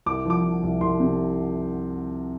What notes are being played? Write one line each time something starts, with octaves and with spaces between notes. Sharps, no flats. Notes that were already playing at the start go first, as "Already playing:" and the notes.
C2 D6
F3 D6
F3
C2
C2 C6
C3